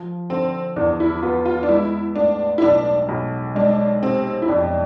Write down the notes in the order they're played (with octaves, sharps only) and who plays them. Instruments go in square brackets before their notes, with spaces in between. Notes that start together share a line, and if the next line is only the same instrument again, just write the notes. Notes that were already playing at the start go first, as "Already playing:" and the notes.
Already playing: [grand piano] F3
[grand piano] D3 [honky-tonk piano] C4
[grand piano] E2 [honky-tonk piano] D4
[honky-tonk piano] E4
[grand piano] B3 [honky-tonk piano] F4
[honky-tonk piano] F4
D4
[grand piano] G#3 [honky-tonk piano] E4
[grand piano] A2 [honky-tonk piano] D4
[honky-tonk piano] E4
[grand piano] B1 [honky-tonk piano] D4
[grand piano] B1
[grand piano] G#3 [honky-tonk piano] D4
[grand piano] C3 [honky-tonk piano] C4
[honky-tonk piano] E4
[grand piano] F2 [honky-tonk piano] D4